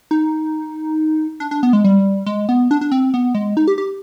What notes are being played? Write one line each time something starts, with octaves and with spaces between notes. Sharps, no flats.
D#4
D4
D4
B3
G#3
G3
G#3
B3
D4
D4
C4
B3
G#3
D#4
G4
G4